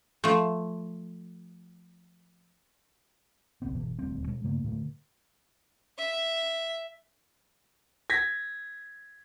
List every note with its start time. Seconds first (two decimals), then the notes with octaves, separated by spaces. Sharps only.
0.24 F3 A3
3.62 F1 B1 B3 C4
3.73 G1 B2 E3
3.99 D#1 D2 G3 C4
4.27 B2 G#3
4.43 G2 C#3 A3 A#3
4.64 A2 D3 A3
5.98 E5
8.10 G#6 A#6 B6